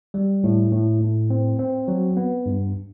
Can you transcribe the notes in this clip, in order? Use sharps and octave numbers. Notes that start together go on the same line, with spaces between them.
G3
A2
A2
A2
C4
C4
F#3
B3
G2